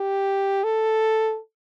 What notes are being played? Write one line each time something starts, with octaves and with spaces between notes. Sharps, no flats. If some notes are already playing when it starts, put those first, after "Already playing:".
Already playing: G4
A4